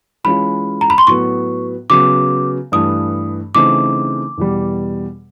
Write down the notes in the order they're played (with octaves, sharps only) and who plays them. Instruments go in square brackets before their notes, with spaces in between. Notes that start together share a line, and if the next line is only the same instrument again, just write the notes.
[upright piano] E3 G#3 C#4 F4 [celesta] B5
[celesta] A#5
B5
C6
[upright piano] A2 F#3 B3 [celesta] C#6
[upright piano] C#3 F#3 B3 [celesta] D6
[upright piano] G2 E3 A3 [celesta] D#6
[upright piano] C#3 E3 A3 C4 D#4 [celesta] D6
[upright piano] E2 B2 G3